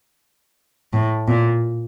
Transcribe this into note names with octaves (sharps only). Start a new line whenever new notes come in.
A2
A#2